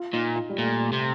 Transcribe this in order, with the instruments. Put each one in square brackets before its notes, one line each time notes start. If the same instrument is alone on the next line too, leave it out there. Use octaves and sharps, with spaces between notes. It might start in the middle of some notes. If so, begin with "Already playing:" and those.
Already playing: [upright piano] F4
[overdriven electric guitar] A#2 [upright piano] D#4
[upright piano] F4
G3
[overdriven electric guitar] A#2 [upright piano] A3
[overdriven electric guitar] C3